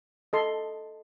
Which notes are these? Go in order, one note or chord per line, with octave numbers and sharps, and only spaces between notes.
A4 D#5 A5 C6